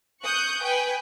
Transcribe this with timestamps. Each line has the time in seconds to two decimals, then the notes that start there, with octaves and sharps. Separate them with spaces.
0.23 C#6 D#6 F#6 G6
0.62 B4 G5 G#5